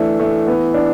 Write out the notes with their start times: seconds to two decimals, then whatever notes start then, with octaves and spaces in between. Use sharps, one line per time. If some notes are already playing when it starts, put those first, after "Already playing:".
Already playing: E3 A3 D4
0.20 A3
0.47 B3
0.74 D4